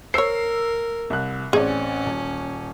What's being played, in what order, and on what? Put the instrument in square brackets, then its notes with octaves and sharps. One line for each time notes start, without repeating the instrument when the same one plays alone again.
[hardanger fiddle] A#4 [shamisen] C5 C#5 [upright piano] E6 C7
[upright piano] C2 F#6
[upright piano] A1 C4 D5 [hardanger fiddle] C#4 [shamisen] G#4
[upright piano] D#1